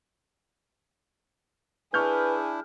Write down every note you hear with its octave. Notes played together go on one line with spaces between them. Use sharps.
D4 E4 G#4 B4 C#6 F6 G6